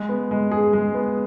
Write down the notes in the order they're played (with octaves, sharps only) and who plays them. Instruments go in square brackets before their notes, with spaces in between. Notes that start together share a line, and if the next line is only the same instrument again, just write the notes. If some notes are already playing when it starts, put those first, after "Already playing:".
Already playing: [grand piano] G#3
B3
G#3
G#4
G#3
B3